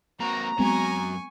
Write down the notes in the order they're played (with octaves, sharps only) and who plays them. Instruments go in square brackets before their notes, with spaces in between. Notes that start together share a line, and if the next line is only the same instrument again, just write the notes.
[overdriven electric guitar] A#3 C4 [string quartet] F#4 [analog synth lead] A#5
[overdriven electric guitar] F#2 F#3 [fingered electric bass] G#3 B3 C4 [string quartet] G#5 C#6